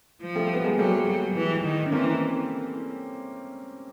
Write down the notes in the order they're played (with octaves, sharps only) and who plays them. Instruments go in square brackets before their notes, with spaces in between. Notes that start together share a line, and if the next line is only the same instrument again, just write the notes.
[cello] F3
[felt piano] G3 A3
B3
G#3 A#3
[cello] F#3 [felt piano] G3 A3
[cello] F#3
E3
D#3
[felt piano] C#4
[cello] E3 [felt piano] A#3 C4